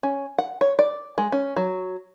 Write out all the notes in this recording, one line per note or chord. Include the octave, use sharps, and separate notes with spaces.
C#4
F#5
C#5
D5
G#3
C#4
F#3